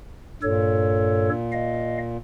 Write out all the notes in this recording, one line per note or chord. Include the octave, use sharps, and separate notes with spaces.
G2 A#2 A4 C#5
D#5 F5